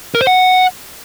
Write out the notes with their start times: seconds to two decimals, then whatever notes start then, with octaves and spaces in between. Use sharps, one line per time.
0.15 A#4
0.21 C5
0.27 F#5